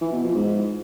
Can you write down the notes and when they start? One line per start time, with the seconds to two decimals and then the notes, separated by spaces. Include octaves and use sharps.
0.01 E3
0.12 B2
0.24 F3
0.35 G#2